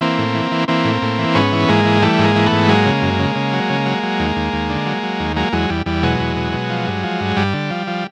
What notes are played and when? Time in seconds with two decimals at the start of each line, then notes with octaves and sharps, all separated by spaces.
0.01 E3 A#3 C4
0.18 A2
0.35 E3
0.52 E3
0.68 E3 A#3 C4
0.85 A2
1.02 A2
1.18 E3
1.35 G#2 B3 C#4
1.52 E3
1.68 G#2 G#3 A#3
1.85 E3
2.02 E3 G3 A3
2.19 G#2
2.24 G#3 A#3
2.36 E3
2.46 A3 B3
2.52 G#2
2.68 F#3 G#3 A#3
2.86 C#3
3.02 F#2
3.19 C#3
3.36 C#3
3.53 F#3
3.70 C#3
3.86 F#3
4.03 F#3
4.19 D#2
4.36 D#2
4.53 D#2
4.70 D3
4.86 F#3
5.03 F#3
5.20 D#2
5.36 F#3 G#3 A#3
5.53 E2 F#3 G#3
5.69 E2 G3
5.86 E2 G3
6.03 B2 F#3 G#3
6.19 E2
6.36 B2
6.53 B2
6.70 F3
6.87 G2
7.03 F3
7.21 G2
7.37 G2 G3
7.54 D3
7.70 F3
7.87 F3